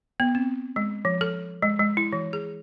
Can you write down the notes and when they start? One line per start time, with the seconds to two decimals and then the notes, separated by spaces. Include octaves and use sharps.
0.20 B3
0.35 C4
0.76 G#3
1.05 F3
1.21 A4
1.62 G#3
1.80 G#3
1.97 E4
2.13 E3
2.33 G#4